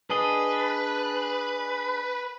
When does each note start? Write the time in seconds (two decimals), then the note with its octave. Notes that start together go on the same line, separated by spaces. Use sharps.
0.10 D4 G#4 B4 D#5